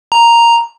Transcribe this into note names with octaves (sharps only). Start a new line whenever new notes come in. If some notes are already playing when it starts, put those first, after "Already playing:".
A#5